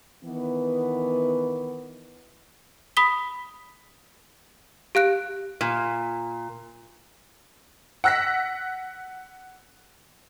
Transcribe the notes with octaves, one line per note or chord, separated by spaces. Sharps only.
D#3 E3 B3
B5 D#6 B6 G7
G4 F5 F#6 D7
A#2
F#5 E6 F#6 A#6 B6